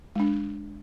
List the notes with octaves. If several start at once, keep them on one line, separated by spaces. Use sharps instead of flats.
G#3 D4